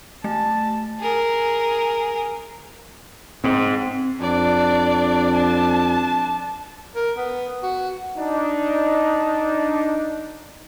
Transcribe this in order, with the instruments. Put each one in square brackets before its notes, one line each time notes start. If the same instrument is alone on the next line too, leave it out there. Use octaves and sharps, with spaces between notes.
[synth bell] A3 [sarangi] A5
[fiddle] G#4 A#4
[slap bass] G#2 [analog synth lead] C4
[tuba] F2 [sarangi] D4 [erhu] D5
[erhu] A5
[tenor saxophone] A#4
B3
F#4
[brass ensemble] D4 D#4